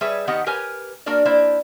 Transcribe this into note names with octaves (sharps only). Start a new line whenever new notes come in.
G3 G#4 B4 C#5 E5
D#3 B3 G4 D#5 F#5
G4 A#4 B4 C#5 G#5
A#3 D4 F#4 A#4 D5
A#3 E4 C5 D5